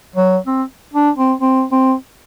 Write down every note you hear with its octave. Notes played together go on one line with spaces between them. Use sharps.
F#3
C4
D4
C4
C4
C4